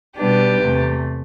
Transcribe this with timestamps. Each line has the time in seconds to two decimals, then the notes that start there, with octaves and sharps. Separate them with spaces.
0.17 B2 G3 B3 D4 G4 B4
0.60 E2 C3 E3 A3